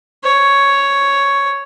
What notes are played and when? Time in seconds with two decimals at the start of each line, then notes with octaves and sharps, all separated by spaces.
0.24 C#5